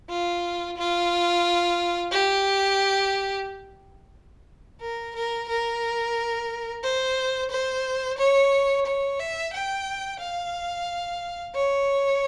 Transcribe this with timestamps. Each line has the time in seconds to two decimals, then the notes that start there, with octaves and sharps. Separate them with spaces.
0.09 F4
0.77 F4
2.12 G4
4.81 A#4
5.16 A#4
5.49 A#4
6.83 C5
7.51 C5
8.19 C#5
8.86 C#5
9.20 E5
9.53 G5
10.20 F5
11.55 C#5